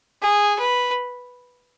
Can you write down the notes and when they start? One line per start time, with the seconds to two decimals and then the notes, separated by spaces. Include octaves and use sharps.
0.22 G#4
0.59 B4